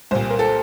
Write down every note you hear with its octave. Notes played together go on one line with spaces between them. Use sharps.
C2 A#2 C5
A#4
A4